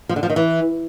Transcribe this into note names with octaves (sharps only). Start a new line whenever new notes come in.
F3
D3
F3
D#3
E3